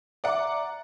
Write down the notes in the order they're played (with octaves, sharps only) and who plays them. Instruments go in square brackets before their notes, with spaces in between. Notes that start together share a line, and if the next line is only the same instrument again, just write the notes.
[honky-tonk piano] D5 F#5 [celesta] E5 A#5 D6